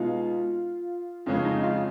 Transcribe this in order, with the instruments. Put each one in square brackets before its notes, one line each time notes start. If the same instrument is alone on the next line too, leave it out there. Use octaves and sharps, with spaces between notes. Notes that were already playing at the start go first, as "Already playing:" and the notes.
Already playing: [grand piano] B2 G#3 D#4 [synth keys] F4
[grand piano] F2 C#3 G#3 C#4 [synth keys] F4
[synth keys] D#4
F4